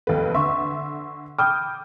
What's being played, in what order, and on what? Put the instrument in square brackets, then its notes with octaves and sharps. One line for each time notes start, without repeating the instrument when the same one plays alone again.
[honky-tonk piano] F1 D#2 B4 [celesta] A4
[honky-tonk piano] D3 E5 [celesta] C6 C#6
[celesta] G5 B5 F6 [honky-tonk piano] D6 D#6 G6